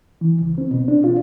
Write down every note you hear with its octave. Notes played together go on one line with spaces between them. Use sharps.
E3
C#2
C4
B2
D4
F4